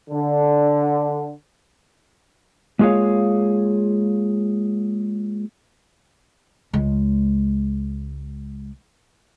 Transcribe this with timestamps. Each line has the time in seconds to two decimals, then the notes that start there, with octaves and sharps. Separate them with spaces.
0.10 D3
2.79 G#3 A#3 F4 G#4 C#5 F5
6.73 C#2 G#3